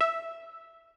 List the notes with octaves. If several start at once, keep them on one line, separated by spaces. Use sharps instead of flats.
E5